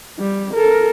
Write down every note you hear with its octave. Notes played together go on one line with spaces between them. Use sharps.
G3
A4 A#4